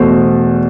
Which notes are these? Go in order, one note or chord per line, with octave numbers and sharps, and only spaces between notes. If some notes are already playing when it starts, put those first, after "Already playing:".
Already playing: E2 B2 A3 C5